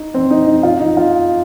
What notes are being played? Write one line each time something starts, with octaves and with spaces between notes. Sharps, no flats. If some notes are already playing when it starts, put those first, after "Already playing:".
Already playing: D#4
C4
D#4
D#4
F4
D#4
F4